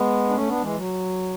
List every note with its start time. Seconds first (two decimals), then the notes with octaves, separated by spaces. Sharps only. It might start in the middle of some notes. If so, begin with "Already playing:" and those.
Already playing: G#3 B3
0.29 D4
0.34 A3 C#4
0.47 B3 D4
0.61 E3 G#3
0.75 F#3